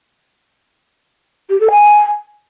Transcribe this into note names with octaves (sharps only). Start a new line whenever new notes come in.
G4
A4
G#5